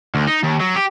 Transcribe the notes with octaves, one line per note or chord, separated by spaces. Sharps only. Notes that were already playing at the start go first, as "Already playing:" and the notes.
D2
D#4
D#2
F#3
G4